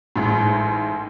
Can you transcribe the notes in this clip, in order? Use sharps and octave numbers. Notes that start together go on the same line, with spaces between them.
A1 G#2